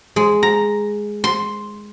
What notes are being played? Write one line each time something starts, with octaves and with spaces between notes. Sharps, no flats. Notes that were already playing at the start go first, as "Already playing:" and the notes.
G#3
A#5
C6